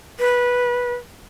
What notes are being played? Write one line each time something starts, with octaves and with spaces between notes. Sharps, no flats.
B4